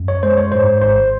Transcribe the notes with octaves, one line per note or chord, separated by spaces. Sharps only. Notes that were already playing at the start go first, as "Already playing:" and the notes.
Already playing: F#2
C#5
G#3 C5
C#5
G#2 C5
G#1 C5